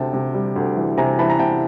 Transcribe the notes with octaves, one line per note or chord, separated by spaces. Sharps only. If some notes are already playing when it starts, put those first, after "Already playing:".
Already playing: D2 C3 G5 A5
C3
G3
D2
E3
C3 G#5 A#5
E3 A5 B5
A#5
C3 G5 A5